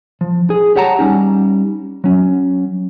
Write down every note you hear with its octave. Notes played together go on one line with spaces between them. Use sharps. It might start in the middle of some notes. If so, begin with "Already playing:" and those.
F3
G#4
G4 C#5 F#5 A5 A#5
G3 C#4 D#4
F#3 C#4